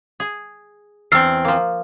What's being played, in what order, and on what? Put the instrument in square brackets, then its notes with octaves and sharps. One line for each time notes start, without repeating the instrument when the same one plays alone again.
[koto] G#4
[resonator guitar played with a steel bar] E2 C4 [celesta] E6 F6 C7
[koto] F3 A#3